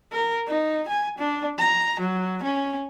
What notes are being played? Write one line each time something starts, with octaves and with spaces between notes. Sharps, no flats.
A#4
D#4
G#5
D4
A#5
F#3
C#4